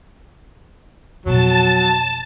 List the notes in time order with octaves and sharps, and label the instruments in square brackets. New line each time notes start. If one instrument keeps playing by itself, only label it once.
[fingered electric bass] F2 B2 [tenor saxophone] F#3 [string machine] A5